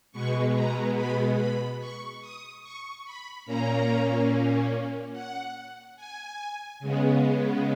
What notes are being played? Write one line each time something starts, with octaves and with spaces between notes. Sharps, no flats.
B2 G#3 B3 C#6
A#5
B5
B5
C#6
D#6
C#6
B5
A#2 A#3 C#4 A#5
F#5
G#5
C#3 G#3 B3